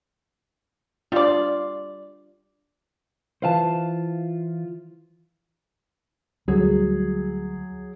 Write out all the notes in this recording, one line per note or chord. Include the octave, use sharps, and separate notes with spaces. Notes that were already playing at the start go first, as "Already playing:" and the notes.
G3 D4 F4 D5
E3 F4 B4 C5 F5 A5
D2 F#3 G3 G#4